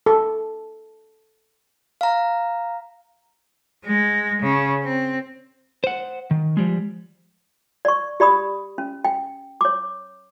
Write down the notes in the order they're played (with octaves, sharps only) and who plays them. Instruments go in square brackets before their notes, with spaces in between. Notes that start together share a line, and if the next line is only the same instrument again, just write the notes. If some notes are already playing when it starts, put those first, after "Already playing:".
[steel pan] A4
[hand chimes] F5 A#5
[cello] G#3
C#3
C4
[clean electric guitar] C5 F#5
D#3
F3 G3 G#3
[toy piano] D5 C#6
G4 D5 B5 D#6
C#4
G5
C#5 D6